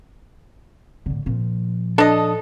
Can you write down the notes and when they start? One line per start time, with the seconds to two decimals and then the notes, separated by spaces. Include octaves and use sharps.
1.06 A2 D3
1.26 A#2 F3
1.98 D4 A4 D#5